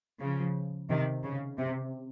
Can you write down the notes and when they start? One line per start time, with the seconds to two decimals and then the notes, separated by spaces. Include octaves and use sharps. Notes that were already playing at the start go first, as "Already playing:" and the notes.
0.20 C#3 F3
0.89 C3 D#3
1.24 C#3
1.58 C3